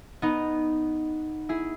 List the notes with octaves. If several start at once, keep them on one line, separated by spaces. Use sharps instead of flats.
B3 D#4
E4 G#4